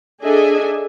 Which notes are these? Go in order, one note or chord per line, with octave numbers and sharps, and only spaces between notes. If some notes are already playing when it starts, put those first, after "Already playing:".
D4 G#4 A4 D#5 E5 G#5